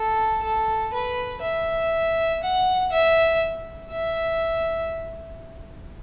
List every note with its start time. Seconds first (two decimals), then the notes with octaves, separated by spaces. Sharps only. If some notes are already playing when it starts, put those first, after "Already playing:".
Already playing: A4
0.44 A4
0.93 B4
1.43 E5
2.43 F#5
2.92 E5
3.92 E5